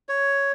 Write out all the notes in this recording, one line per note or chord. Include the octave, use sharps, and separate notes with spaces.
C#5